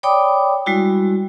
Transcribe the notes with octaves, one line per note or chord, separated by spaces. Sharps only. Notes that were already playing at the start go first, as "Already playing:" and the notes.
C#5 D5 G5 B5 D6 D#6
G3 G#3 E4 F#4